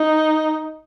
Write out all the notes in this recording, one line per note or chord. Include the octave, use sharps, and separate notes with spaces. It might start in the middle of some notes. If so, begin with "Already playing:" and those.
Already playing: D#4